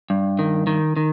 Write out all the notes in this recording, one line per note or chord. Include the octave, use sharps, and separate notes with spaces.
G2
D#3
D#3
D#3